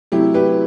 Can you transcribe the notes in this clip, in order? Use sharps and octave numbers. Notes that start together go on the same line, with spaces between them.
C3 F#3 A3 E4 G4
G4 B4